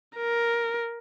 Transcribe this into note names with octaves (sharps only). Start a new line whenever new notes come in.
A#4